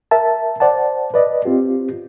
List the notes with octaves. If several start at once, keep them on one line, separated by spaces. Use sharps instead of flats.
A#4 E5 A5
C5 D5 F#5 A5
B4 D5 D#5
C4 F4 G4